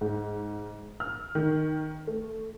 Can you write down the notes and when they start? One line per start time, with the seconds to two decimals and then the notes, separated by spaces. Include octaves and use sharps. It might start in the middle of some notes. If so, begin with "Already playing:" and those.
0.01 G#2
1.00 F6
1.35 D#3
2.07 A3